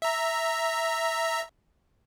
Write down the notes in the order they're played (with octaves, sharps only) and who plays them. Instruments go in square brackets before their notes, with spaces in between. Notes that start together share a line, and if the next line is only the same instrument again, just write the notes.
[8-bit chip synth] E5 A#5